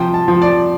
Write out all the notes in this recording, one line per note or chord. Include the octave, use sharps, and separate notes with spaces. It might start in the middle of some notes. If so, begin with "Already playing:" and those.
Already playing: C3 F3 G5
A5
F3
D5